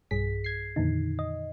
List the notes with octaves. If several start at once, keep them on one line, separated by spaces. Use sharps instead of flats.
B1 G2 G#4 B6
G#6 C7
F2 A#2 D3 D#3 D#4
D#5